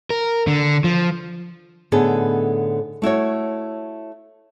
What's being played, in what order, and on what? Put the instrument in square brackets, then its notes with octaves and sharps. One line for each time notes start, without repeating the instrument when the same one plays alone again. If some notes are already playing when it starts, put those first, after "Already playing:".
[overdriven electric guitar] A#4
D3
F3
[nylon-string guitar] A2 D3 B3 D#4 G#4 A4
A3 E4 F#4 C#5